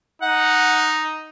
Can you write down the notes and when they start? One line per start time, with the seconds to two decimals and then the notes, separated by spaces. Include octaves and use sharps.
0.22 D#4 F#5